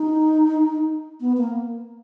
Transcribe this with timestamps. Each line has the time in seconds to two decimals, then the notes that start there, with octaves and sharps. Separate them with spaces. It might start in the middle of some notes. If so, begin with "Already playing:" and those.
Already playing: D#4
1.21 B3
1.37 A#3